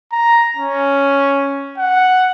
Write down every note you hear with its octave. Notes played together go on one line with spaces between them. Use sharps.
A#5
C#4
F#5